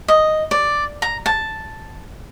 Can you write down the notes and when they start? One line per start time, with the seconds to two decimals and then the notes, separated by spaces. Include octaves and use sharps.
0.08 D#5
0.51 D5
1.02 A#5
1.26 A5